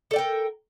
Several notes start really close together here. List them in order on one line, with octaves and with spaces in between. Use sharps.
A4 D5 G5 A#4